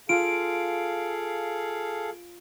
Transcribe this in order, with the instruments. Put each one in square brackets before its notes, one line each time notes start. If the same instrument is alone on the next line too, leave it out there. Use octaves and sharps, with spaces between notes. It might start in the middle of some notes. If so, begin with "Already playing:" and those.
[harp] F4 [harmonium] G#4 A4 F5 [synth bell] D7